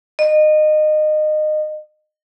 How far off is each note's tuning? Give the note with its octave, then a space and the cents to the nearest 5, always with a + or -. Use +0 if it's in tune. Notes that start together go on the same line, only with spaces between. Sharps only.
D#5 -25